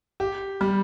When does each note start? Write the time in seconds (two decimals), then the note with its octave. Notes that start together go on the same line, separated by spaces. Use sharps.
0.20 G4
0.61 G3